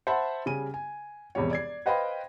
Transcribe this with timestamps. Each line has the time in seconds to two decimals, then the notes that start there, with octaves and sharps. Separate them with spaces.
0.07 C5 E5 F#5 A5 B5
0.46 C#3 G3 G#5 D#7
0.74 G#5
1.35 E1 E2 C3 G3 C#5
1.51 D5 G#6 C7
1.86 B4 C5 D#5 F5 G5 B5